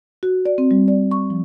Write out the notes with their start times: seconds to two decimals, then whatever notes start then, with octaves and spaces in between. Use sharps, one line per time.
0.23 F#4
0.46 D5
0.58 C4
0.71 G3
0.88 D5
1.11 C#6
1.30 F3